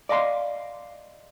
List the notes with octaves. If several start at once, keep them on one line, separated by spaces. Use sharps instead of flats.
D5 D#5 F5 A#5 C6